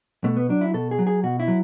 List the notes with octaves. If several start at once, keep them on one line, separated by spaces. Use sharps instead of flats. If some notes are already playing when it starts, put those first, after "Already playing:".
B2 A3
B3
F#3 D4
E4
B2 A4
G#4
F#3
G#4
B2 F#4
E4
F#3